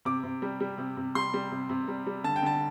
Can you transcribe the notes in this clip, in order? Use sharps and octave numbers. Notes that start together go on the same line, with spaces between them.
C3 D6
C3
G3
G3
C3
C3
G3 C6
G3
C3
C3
G3
G3
D3 A5
G5
D3 A5